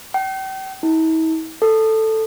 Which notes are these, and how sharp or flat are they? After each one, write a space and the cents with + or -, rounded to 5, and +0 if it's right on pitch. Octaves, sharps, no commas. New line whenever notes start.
G5 -40
E4 -45
A4 +5